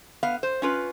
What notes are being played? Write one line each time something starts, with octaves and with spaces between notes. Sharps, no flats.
B3 F5
C5
C#4 F4 B4